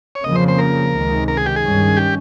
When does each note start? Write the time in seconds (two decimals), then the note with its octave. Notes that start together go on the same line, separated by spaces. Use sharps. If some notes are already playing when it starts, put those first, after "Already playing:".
0.15 C#5
0.24 F2 C#3 F3 A#3 D#5
0.36 C5
0.48 C5
0.58 A#4
0.94 C#2 C3 D#3 G#3
1.28 A#4
1.37 G#4
1.46 G4
1.56 G#4
1.62 G2 D#3 G3 C#4
1.97 G4